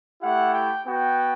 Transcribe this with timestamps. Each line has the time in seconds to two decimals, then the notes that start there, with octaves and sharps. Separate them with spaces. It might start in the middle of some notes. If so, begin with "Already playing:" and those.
0.22 A3 E4 G4 F#5
0.54 G5
0.86 B3 F#4 G5